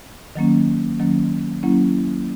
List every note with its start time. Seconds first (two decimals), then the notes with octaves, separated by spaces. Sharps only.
0.36 D#3 F#3 A#3 C#4
1.00 D#3 F#3 A#3 C#4
1.63 F#3 A#3 C#4 E4